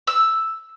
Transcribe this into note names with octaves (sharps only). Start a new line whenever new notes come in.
E6